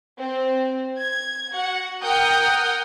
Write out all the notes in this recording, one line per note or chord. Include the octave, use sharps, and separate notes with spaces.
C4
G#6
F#4 F#5
A#4 F#5 G5 D#6 F6 G6